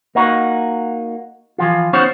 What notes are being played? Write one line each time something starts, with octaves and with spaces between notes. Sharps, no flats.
A#3 D#4 F#4
E3 F3 F4
B3 C#4 D#4 F#4 C5 C#5